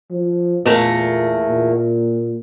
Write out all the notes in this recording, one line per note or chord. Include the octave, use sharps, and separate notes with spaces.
F3
E2 A#2 A3 A#3
A#2